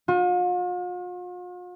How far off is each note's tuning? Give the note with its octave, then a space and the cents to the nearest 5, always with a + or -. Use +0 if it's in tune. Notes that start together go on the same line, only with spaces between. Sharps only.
F4 +45